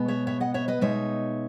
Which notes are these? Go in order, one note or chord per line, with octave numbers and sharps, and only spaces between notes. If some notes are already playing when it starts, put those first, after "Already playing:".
Already playing: B2 G#3 B3
C#5 E5
C#5 E5
D#5 F#5
C#5 E5
B4 D#5
B2 G#3 D#4 C#5 E5